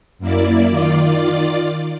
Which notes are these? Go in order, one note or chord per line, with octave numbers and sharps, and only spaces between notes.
F#2 A#3 E4 D5
D#3 F4 D5 D6